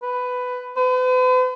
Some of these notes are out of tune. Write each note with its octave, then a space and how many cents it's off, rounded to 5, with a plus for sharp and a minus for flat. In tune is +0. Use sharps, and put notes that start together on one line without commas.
B4 +10
B4 +45